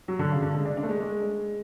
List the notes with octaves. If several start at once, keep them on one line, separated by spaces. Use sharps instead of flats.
F#3
D3
C#3
D3
G#3
D4
D4
A3
G#3
G#3